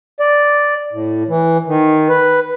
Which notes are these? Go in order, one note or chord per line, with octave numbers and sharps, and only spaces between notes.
D5
A2
E3
D#3
B4